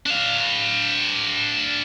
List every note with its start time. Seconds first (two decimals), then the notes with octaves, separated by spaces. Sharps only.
0.06 D4 F5